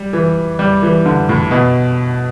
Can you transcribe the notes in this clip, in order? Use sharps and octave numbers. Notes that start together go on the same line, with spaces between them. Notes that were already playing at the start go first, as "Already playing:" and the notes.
Already playing: G3
E3
G3
E3
D3
A2
B2